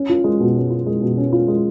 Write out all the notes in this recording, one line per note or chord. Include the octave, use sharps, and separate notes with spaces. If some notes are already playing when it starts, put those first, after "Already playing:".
Already playing: C#4
F4
G#3
B2
C#4
F4
G#3
B2
C#4
F4
G#3